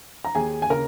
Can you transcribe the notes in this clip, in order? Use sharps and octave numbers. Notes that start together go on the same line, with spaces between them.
A#5
D#2 G#4 G#5
G#5
C#3 A#4 A#5